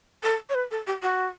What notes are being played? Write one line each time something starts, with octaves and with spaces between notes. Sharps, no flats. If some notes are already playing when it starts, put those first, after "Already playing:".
A4
C#5
B4
A4
G4
F#4